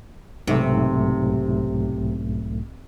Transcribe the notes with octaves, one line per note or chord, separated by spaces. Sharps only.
B1 G#2 C3 A3